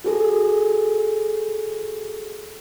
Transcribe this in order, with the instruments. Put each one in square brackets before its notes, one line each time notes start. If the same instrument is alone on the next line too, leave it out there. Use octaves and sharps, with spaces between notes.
[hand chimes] F#4 G#4 A4